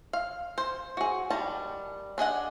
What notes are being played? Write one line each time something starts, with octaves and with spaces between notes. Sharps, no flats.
F5
C5
F#4 G#4
D#3 G3 A5 A#5
D4 G#4 D#5 F#5